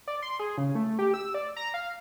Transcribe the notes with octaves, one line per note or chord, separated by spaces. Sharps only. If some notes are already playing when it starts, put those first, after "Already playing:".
D5
C6
G#4
C#3
A3
G4
E6
D5
A#5
F5